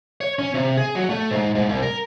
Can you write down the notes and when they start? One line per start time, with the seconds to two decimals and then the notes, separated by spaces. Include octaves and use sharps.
0.21 C#5
0.39 C#4
0.54 C3
0.77 G#4
0.95 F#3
1.10 A3
1.31 G#2
1.55 G#2
1.69 C2
1.82 A#4